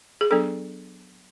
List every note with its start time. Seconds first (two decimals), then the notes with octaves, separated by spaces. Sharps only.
0.21 G#4
0.31 F#3 B3 D4 A4